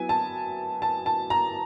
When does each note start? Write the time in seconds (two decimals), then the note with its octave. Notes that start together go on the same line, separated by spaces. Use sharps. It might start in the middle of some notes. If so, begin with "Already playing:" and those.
Already playing: F#3 B3 E4 G#5
0.09 A5
0.82 A5
1.06 A5
1.30 A#5